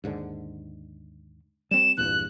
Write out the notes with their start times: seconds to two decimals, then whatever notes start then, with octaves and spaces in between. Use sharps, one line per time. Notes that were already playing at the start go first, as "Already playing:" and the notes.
0.04 D#2 G#2 D3
1.71 G3 C4 E7
1.97 A#1 E2 G2 F#6